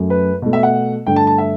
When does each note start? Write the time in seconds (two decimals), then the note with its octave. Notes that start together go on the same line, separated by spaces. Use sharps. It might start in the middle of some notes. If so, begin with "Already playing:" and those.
Already playing: F#2 F#3 A3
0.10 B4
0.42 B2 A3
0.53 E5
0.63 F#5
1.06 G2 D3 A3 G5
1.16 A5
1.27 A5
1.38 E5